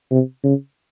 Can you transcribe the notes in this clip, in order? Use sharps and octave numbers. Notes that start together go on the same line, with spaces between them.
C3
C#3